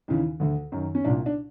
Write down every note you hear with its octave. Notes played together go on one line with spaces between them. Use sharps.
D#2 C#3 E3
D2 D3
F#2 D#3
C#4
C2 A#2 D4
D4